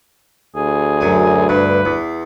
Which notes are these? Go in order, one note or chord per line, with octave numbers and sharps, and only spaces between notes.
D2 G#4
F#2 G#5
G2 B4
E2